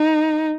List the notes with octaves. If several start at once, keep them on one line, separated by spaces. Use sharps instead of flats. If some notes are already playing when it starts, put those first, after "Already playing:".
Already playing: D#4